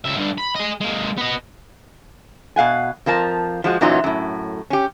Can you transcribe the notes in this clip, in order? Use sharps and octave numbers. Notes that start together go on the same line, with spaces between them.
C#2 E5
G2 D3
B5
G#4 D#5
G#3 A#3
B3 D#5
B2 F5 F#5 G#5
F2 F3 A#4 A5
F3 G#3 F#4
F#2 A#2 E3 F#3 D#4 F4
F#2 A2
C#4 G4